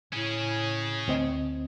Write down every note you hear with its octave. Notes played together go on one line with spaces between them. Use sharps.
A2 C#4 G#4
D2 C4 D#5